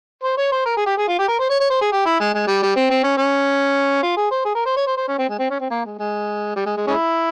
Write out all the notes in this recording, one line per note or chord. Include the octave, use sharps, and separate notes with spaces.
C5
C#5
C5
A#4
G#4
G4
G#4
F4
G4
A#4
C5
C#5
C#5
C5
G#4
G4
E4
G#3
G#3
G3
G3
C4
C4
C#4
C#4
F4
G#4
C5
G#4
A#4
C5
C#5
C5
C5
C#4
C4
G#3
C4
C#4
C4
A#3
G#3
G#3
G3
G#3
G#3
G#3 C#4 E4